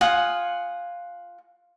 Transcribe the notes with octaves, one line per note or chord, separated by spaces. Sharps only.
F4 F#5 G#5 D#6